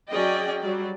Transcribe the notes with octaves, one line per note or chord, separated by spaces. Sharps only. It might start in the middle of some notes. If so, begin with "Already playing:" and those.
F#3 C#4 G#4 D5 D#5 G5
F#3 G3 D5